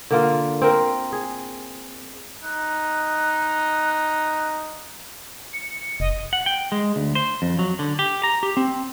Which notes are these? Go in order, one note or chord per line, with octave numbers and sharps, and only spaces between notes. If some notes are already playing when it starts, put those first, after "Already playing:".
D3 A#3 F4
C4 A#4
G#4
D#4 F#6
C#7
F1 D#5
F#5
G5
G#3
D2
C5
F2
F#3
D3
G4
A#5
G4
C4